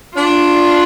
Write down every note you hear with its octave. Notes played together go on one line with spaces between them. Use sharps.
D4 F4